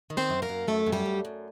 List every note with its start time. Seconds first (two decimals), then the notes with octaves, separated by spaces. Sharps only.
0.10 D#3
0.17 C4 C5
0.30 F#2
0.42 A#3 A#4
0.49 F#2
0.67 F#2 A3 A4
0.86 F#2
0.92 G3 G4
1.06 F#2
1.25 F#2